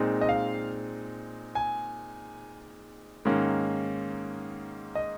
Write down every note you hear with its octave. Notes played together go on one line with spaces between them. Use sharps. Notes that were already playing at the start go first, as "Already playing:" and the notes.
Already playing: A#2 G#3 C4 D#4
D#5
F5
G#5
G#2 D#3 A#3 C#4
D#5